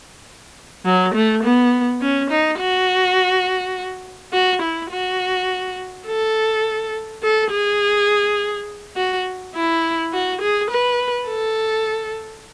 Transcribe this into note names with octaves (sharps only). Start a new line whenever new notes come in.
F#3
A3
B3
C#4
D#4
F#4
F#4
E4
F#4
A4
A4
G#4
F#4
E4
F#4
G#4
B4
A4